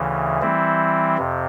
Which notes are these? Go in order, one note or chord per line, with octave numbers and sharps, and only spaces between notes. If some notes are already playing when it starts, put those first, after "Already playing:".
Already playing: D2 C#3 E3
E3 G3 C4 E4
F2 C3